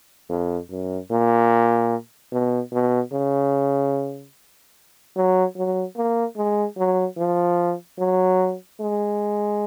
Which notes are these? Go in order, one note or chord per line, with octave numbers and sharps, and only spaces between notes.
F2
F#2
A#2
B2
B2
C#3
F#3
F#3
A#3
G#3
F#3
F3
F#3
G#3